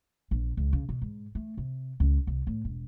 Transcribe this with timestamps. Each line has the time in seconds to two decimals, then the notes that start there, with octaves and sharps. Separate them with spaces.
0.31 A#1
0.57 C#2
0.73 C#3
0.89 B2
1.02 G#2
1.35 A3
1.57 C3
2.00 C#2
2.27 C2
2.47 A2
2.65 E1